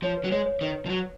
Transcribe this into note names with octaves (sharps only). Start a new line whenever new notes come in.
F3 C#5
B4
F#3
G#3 C#5
C#5
D#3 B4
F3
F#3